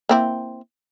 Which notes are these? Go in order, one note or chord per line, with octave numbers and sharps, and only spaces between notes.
A#3 C4 E4